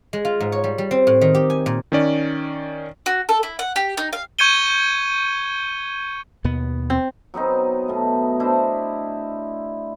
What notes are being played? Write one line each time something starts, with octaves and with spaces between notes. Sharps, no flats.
G#3
F4
G#2
C#5
G3
G3
C4
A2
D#3
G4
G#5
A#2
D#3 C#4 D5
F#4
A4
E4
F#5
G4
D#4
F5
C#6 G6 G#6 C#7 D#7 G7
D#2 B2 B3
C4
F#3 B3 C4 D#4
B2 A3
D4 E4 C5 D#5